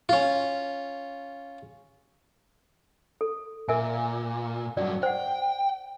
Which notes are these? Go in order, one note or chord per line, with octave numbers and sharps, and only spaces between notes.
C#4 F4
A4
A#2 A#4 E5 G#5
G2 F#3 D5
C5 F#5 G5